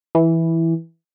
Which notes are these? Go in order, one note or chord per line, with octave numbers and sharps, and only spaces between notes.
E3